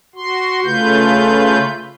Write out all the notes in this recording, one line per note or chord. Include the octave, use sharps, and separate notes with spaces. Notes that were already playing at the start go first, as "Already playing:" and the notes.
F#4 C6
C#3 A3 F4 B4 G6